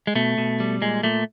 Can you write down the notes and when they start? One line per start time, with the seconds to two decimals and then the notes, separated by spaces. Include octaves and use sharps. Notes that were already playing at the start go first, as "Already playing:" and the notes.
0.07 G#3
0.15 B2 A3
0.38 B2
0.60 G3
0.82 A#2 G#3
1.03 A#2 A3